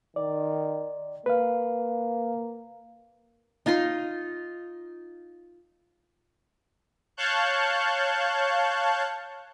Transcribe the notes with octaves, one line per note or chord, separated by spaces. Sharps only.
D#3 D5
A#3 B4 F5
D#4 F4 D#5 C6
C#5 F5 A5 C#6 F#6 G6